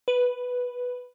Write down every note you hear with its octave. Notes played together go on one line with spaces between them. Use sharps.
B4